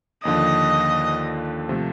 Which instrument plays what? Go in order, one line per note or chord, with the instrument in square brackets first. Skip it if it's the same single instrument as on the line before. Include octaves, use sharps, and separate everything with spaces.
[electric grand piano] D#2 D3 F3 [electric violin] D#5
[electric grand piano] C3 F3 A3